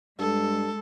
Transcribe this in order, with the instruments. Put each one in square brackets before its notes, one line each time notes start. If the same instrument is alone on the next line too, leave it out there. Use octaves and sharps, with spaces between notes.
[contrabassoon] G2 [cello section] G#3 [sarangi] A4